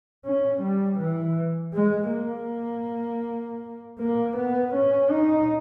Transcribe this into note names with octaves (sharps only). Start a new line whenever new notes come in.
C#4
G3
E3
G#3
A#3
A#3
B3
C#4
D#4